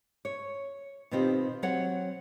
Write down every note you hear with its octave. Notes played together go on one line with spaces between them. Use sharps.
C#5
B2 D#3 C4 F4 G4
F#3 C4 C#5 F#5